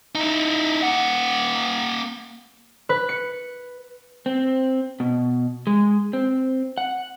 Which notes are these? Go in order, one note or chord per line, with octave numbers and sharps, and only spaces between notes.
D#4 E4
A#3 F#5
B4
C#7
C4
B2
G#3
C4
F#5